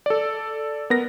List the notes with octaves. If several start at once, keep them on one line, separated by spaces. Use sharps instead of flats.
A4 D5
B3 A#4 A#6